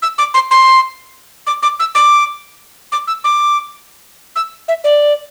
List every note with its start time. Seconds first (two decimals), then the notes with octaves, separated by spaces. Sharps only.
0.02 E6
0.18 D6
0.34 C6
0.51 C6
1.47 D6
1.62 D6
1.80 E6
1.95 D6
2.92 D6
3.07 E6
3.24 D6
4.36 E6
4.68 E5
4.84 D5